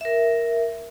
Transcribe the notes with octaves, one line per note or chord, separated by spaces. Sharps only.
A#4 E5